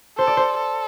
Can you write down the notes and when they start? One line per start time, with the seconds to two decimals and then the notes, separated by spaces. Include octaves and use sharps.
0.18 A4 C5
0.27 D5
0.37 C5
0.57 A4